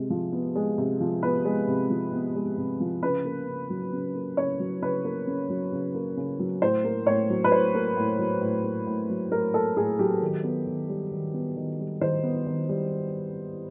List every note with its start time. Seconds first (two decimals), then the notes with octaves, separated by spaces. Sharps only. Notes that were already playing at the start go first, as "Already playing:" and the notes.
Already playing: C3 G#3
0.10 F3
0.33 B3
0.56 G#3
0.78 C3
1.00 F3
1.23 B3 B4
1.45 G#3
1.68 C3
1.90 F3
2.12 B3
2.35 G#3
2.58 C3
2.80 F3
3.03 C#3 B4
3.25 A#3
3.47 C#3
3.70 F#3
3.93 C#3
4.15 A#3
4.37 C#3 C#5
4.60 F#3
4.82 C#3 B4
5.05 A#3
5.27 C#3
5.50 F#3
5.72 C#3
5.94 A#3
6.17 C#3
6.40 F#3
6.62 A2 C5
6.84 A#3
7.07 A2 C#5
7.30 F#3
7.44 B4
7.52 A2 C5
7.75 A#3
7.97 A2
8.19 F#3
8.42 A2
8.64 A#3
8.87 A2
9.10 F#3
9.32 A2 A#4
9.54 A#3 A4
9.77 A2 G#4
9.99 F#3 G4
10.22 D#3
10.44 B3
10.67 D#3
10.89 G3
11.11 D#3
11.34 B3
11.56 D#3
11.79 G3
12.01 D#3 C5
12.24 B3
12.47 D#3
12.69 G3